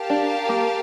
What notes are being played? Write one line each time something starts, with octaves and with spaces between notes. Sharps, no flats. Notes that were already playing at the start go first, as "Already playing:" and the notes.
Already playing: G4 A#4 F5 A5
D4
A#3